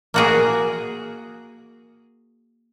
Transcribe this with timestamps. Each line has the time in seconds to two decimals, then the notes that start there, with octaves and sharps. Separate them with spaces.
0.14 A#3 F#4 G#4